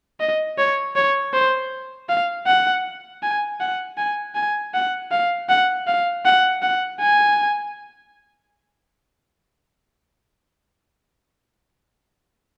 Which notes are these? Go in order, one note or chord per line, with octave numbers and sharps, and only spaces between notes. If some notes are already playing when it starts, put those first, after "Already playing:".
D#5
C#5
C#5
C5
F5
F#5
G#5
F#5
G#5
G#5
F#5
F5
F#5
F5
F#5
F#5
G#5